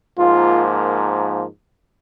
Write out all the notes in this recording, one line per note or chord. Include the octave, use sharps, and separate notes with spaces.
G#2 F3 A#3 F4